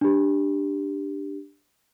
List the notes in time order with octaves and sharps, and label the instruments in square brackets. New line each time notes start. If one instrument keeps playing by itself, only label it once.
[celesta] D4 G4